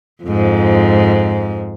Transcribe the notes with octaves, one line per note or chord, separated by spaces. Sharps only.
F2 G#2